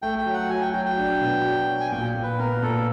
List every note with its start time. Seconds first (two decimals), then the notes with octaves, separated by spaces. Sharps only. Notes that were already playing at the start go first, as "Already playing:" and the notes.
0.02 A3 G5
0.18 G5
0.26 F#3
0.34 F#5
0.50 F#3 G#5
0.61 G5
0.73 F#3 G5
0.85 G5
0.97 D4
1.21 B2
1.45 F#3
1.68 F#3
1.80 G#5
1.92 A#2 G5
2.15 A#2
2.23 B4
2.39 B3 A#4
2.62 A#2 A4